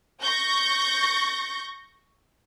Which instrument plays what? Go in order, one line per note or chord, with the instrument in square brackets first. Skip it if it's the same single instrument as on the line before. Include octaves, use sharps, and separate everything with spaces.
[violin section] C#6 G6 A#6